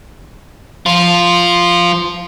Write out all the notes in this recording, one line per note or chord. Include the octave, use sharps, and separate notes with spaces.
F3 F4